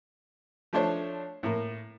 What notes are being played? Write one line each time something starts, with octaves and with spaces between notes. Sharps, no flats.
F3 A3 D4 C5 C#5
A2 A#3